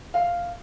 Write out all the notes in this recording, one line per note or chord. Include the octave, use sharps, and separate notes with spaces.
F5